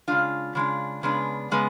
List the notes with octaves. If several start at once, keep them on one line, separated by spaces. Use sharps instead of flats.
C#3 G#3 D4 F4
C#3 G#3 D4
C#3 G#3 B3 D4
C#3 G#3 B3